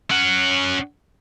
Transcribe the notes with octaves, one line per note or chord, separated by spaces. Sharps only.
C#4 F#5